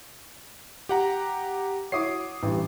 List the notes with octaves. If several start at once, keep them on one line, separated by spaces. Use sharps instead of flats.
G4 F#5 A#5
E4 F#4 C#5 D6 D#6 C7
A1 G2